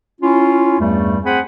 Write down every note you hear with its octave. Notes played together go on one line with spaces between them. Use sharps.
C#4 E4 F4
E2 G2 G3 A3
C4 G#4 C5 F#5 G#5 B5